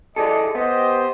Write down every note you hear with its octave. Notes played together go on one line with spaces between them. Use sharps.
E3 G#4 A4 D5 D#5
B3 G4 C5 D#5